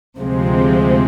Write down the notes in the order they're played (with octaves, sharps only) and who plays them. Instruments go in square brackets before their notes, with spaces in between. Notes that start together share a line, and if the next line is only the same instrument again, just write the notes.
[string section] D2 C3 F3 G#3 C4